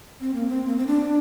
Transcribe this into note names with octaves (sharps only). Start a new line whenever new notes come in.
C4
A#3
C4
A#3
C4
D4